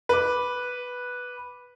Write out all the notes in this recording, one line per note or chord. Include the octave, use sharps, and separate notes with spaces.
B4 D6